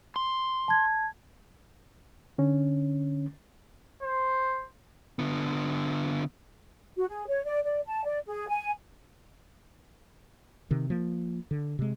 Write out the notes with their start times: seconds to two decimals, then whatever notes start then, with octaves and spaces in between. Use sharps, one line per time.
0.16 C6
0.68 A5 G#6
2.38 D3 C#4
4.03 C5
5.19 D3 B3
6.97 F#4
7.09 G#4
7.27 C#5
7.45 D5
7.63 D5
7.86 A5
8.05 D5
8.26 G#4
8.48 G#5
10.71 C3 D#3
10.90 F3 A#3
11.51 D3
11.79 C3 G#3